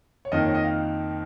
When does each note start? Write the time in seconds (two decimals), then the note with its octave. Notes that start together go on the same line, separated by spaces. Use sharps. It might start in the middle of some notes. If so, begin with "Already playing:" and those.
0.25 C#5
0.32 F2 D#3 A#3 D#4 D#5
0.45 C#5
0.55 D#5
0.64 F5